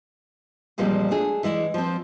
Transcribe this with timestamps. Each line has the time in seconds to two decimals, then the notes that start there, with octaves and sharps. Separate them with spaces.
0.78 E2 A#2 F3 G3 G#3 C4
1.11 A3 D4 G#4
1.43 E3 G#3 E4 D5
1.74 F3 C4